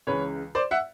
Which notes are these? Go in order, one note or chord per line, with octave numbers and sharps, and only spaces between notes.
C#2 C#3 E3 B4 C#5
C5 D5
E5 F#5